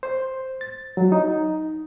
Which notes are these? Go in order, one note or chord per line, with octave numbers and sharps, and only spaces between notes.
C5
A6
F#3
D#4